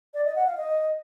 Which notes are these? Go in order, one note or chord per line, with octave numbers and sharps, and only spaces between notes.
D5
D#5
F#5
F5
D#5